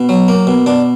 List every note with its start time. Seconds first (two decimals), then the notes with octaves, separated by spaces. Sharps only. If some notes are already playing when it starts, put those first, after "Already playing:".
Already playing: B2
0.09 F#3
0.28 A#3
0.47 B2
0.66 B2 D4